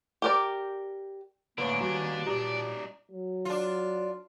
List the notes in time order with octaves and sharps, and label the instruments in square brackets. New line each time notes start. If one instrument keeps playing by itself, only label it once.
[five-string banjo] G4 A#4 D5
[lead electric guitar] A2 D3 [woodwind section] A#3 C#4 [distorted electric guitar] D4 [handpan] B4 C#5
[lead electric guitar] D#2 [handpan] G3 F#4
[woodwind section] A#2 [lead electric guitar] D#4 D5 [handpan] G4
[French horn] F#3
[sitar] D4 F4